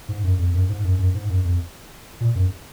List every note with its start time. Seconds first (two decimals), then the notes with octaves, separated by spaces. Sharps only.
0.09 G#2
0.24 F#2
0.39 F2
0.54 F#2
0.69 G#2
0.84 F#2
0.99 F#2
1.15 G#2
1.30 F#2
1.45 F2
2.21 A#2
2.35 F#2